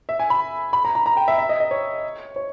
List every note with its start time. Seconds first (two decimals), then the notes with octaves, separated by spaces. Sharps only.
0.09 E5
0.19 G#5
0.30 B5
0.73 B5
0.85 A#5
0.95 A#5
1.06 A#5
1.17 G5
1.28 E5
1.38 E5
1.49 D#5
1.60 D#5
1.71 C#5
2.36 C#5